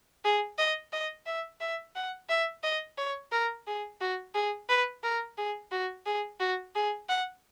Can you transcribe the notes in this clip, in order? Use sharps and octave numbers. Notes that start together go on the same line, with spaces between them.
G#4
D#5
D#5
E5
E5
F#5
E5
D#5
C#5
A#4
G#4
F#4
G#4
B4
A#4
G#4
F#4
G#4
F#4
G#4
F#5